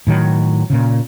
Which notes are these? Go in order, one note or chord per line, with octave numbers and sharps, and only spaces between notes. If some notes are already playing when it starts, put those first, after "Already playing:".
A2 D#3 F#3
A#2 C#3